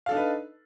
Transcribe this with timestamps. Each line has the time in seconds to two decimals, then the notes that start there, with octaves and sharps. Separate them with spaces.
0.06 F5
0.09 A4
0.12 D4
0.14 D#4
0.17 B4